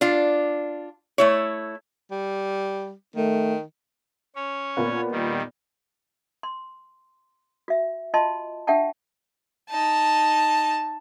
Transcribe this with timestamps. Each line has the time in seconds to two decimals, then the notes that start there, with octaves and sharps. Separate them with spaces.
0.01 D4 F4
1.18 A3 E4 C#5
2.11 G3
3.16 D#3 A3
4.35 C#4 C#5
4.77 A#2 A#3 B3
5.11 D#3 G3
6.43 C6
7.68 F#4 E5
8.14 F4 D#5 A5 C6
8.67 D4 G4 E5 F#5 G5 A5
9.70 D#4 A5